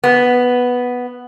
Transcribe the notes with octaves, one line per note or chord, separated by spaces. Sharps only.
B3